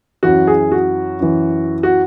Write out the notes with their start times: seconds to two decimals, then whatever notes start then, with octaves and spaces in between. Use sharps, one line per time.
0.23 F#2 E3 F#4
0.47 G#4
0.72 F#4
1.20 F#2 E3
1.83 F#4